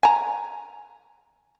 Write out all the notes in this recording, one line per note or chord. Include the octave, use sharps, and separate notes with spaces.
G#5 A#5